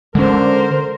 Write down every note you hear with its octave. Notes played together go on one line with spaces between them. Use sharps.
D3 G#3 C#4 A#4 C5